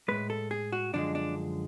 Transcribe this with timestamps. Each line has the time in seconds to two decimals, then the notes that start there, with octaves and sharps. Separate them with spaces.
0.08 A2 G#3 B4
0.30 A4
0.51 G#4
0.72 F#4
0.93 F#2 D3 F3 G#3 D4
1.15 D4